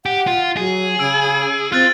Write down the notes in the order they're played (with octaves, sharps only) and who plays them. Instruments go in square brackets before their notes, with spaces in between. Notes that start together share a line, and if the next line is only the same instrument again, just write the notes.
[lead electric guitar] G4 [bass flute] F#5
[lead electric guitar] F4
[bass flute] F#3 [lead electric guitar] G#4
[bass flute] C#3 [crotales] E6 D7 D#7
[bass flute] C4 [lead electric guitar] F4 [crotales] F6 F#6 A6